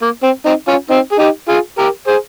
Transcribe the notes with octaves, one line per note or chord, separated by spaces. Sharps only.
A#3
C4
C4 D#4
C#4 F4
C4 D#4
G#4
D#4 G4
F4 G#4
G4 A#4
G#4 C5